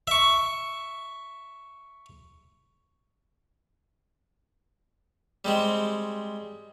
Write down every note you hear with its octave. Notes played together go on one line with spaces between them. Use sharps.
E5 C#6
G3 G#3 C4